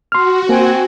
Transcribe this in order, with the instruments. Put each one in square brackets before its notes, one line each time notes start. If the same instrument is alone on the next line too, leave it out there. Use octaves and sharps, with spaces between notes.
[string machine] F#4 [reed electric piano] C6 F6
[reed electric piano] A#3 [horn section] C4 G#5